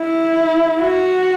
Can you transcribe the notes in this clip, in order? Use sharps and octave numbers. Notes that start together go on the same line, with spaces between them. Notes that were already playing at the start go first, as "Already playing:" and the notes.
Already playing: E4
F#4